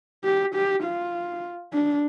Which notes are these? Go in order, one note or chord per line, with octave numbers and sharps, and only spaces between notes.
G4
G4
F4
D4